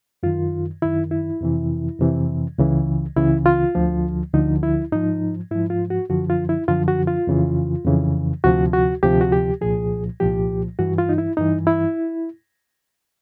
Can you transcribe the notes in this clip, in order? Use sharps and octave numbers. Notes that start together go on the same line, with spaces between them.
F#2 D#3 F4
F#2 D#3 E4
E4
F2 C3 E3
F2 C3 E3
C#2 C#3 E3
C#2 C#3 E3 E4
F4
D2 D3 F3
D2 D3 F3 D#4
E4
G#2 F3 D#4
G#2 F3 E4
F4
F#4
F#2 D3 F3 F#4
F4
E4
F#2 D3 F3 F4
F#4
F4
F2 C#3 E3
F2 C#3 E3
D2 C3 F3 F#4
F#4
D2 C3 F3 G4
F#4
G4
C2 A#2 F3 G#4
C2 A#2 F3 G4
G2 E3 F#4
F4
D#4
E4
G2 E3 D#4
E4